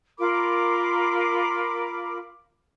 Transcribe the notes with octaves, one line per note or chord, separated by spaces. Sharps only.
F4 A#4 B5 D6